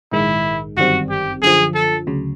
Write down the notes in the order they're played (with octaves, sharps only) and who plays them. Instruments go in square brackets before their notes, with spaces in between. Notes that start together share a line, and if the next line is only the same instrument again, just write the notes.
[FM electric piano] A#1 G#2 D#3 G#3 [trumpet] E4
[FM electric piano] G1 F#2 D#3 G3 C4 [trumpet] F#4
[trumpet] G4
[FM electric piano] F#2 D3 F3 [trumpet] G#4
[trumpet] A4
[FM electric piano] D2 C#3 F#3